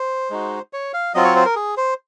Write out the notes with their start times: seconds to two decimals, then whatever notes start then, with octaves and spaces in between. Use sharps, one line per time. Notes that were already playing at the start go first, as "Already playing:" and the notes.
Already playing: C5
0.30 G#3 D#4 F#4
0.73 C#5
0.94 F5
1.15 F#3 C4 F4 D#5
1.25 C#5
1.36 C5
1.45 A#4
1.56 G#4
1.77 C5